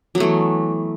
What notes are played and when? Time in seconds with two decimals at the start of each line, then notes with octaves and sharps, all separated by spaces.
0.15 F#3
0.18 B3
0.20 A3
0.23 E3